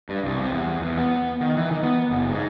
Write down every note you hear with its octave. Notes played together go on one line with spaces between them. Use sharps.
G2
C2
C3
E2
E2
B3
D#3
E3
D#3
B3
F#1
G#2